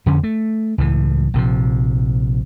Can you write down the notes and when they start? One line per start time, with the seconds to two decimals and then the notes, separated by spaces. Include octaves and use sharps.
0.06 F2 D3 C#4
0.23 A3
0.78 C#2 A2 E3
1.34 A#1 C3 D#3 F3